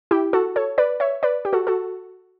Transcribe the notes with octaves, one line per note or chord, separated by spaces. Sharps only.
E4 G4
F#4 A4
A4 C#5
B4 D5
C#5 E5
B4 D5
G4
F#4 A4
F#4 A4